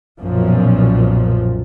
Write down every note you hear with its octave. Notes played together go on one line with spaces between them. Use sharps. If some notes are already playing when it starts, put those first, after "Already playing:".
B1 F#2 A#2 F3